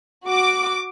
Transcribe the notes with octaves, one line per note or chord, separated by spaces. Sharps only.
F#4 D6